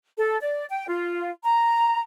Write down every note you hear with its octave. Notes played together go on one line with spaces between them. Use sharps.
A4
D5
G5
F4
A#5